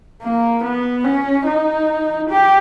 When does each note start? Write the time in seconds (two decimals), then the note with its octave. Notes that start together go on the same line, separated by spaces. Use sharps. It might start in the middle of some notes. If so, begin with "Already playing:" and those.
0.22 A#3
0.64 B3
1.04 C#4
1.46 D#4
2.29 G4